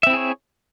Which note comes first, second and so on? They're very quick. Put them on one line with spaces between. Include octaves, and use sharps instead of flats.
E5 C4 E4 G#4 C#5